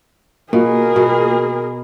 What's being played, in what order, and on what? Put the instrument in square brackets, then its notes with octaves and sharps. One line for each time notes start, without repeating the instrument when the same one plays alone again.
[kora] B2 [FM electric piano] A#3 F4 [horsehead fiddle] G#4 A#4
[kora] B2